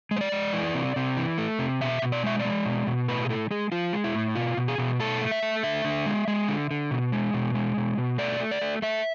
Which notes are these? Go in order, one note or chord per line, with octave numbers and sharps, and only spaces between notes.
G#3
C5
D5
G#3
E3
C3
C3
E3
A3
C3
B2 E5
B2
D5
G#3 E5
D5
G#3
B2
B2
A2 B4
G#4
A2 A4
G#3 G#4
F3 F4
G#3
E4
A2
B2 F4
B2
G#4
B2
A3 A4
A3
E5
A3
D3 E5
D3
G#3
G#3
D3
D3
B2
G#3
B2
G#3
B2
B2
A3 D5
A3
D5
A3
A3 E5